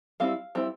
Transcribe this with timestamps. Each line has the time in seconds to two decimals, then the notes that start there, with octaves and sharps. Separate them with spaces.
0.20 G3 C4 E4 F5
0.55 G3 C4 E4